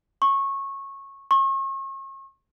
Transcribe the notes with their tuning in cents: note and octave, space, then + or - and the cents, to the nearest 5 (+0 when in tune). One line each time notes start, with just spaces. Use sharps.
C#6 -15
C#6 -40